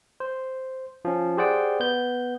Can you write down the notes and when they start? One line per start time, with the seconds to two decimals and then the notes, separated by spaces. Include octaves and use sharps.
0.20 C5
1.05 F3 C#4
1.37 G4 G#4 C5 D5 F#5 G5
1.80 B3 G6